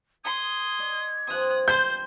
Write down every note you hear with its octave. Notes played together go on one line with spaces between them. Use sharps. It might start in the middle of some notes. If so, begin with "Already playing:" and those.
C6 D#6 G#6
D5 D#5 G#5
G2 F3 C4 D#6 F#6
C5 G6